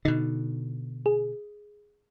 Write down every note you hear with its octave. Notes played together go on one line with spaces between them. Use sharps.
B2 D3 D#4
G#4